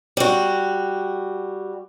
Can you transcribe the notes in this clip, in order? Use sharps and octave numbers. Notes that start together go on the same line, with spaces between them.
G3 F#4